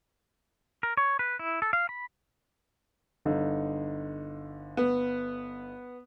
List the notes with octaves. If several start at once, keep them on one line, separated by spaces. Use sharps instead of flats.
A#4
C#5
B4
E4
A4
F5
B5
G1 D3 D#4
B3